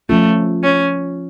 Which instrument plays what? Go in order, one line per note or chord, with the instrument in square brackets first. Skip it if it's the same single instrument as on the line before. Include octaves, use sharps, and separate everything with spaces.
[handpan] F3 C#4 F4 [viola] A3
[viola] C#4